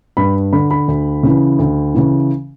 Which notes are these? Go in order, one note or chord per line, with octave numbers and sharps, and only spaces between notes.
G2 B5
D3 B5
B5
D2
C#3 E3
D2
C#3 E3